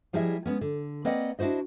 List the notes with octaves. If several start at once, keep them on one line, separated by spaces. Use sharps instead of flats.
F3 G3 E4 G#4 D#5 E5
G#3 B3 C#4
D3
A#3 C4 B4 D5 D#5 F#5
D4 E4 F#4 C5 D#5